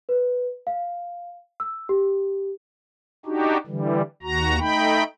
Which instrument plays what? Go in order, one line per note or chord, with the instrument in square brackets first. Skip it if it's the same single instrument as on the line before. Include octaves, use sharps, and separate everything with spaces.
[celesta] B4
F5
E6
G4
[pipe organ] D4 D#4 F#4 G4
D3 E3 G3
D#2 F#4 A#5
A3 D#4 G5 B5